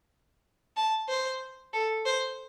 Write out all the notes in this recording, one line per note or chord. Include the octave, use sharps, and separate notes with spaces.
A5
C5
A4
C5